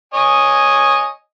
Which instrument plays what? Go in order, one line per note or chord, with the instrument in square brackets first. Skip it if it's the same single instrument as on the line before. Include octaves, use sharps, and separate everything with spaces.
[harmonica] C#5 D#5 G#5